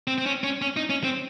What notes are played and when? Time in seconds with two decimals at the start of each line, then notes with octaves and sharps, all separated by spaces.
0.08 C4
0.18 C4
0.26 C#4
0.44 C#4
0.62 C#4
0.77 D#4
0.90 C#4
1.04 C4